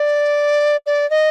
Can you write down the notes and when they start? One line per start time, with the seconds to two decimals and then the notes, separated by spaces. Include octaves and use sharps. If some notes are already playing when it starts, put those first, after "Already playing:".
Already playing: D5
0.86 D5
1.10 D#5